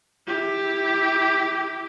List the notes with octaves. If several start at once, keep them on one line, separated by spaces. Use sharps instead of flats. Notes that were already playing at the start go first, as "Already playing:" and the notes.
E4 G4